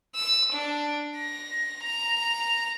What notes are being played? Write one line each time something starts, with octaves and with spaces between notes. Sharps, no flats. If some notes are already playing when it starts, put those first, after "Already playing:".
E6
D4
A#6
A#5